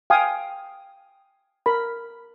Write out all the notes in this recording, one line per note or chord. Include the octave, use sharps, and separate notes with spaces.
F5 G5 G#5 D#6
A#4 B5